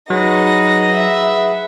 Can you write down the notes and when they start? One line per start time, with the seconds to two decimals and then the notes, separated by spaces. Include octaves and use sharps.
0.10 F#3 D#4 G#4 B4 F#5 A#6
0.94 E5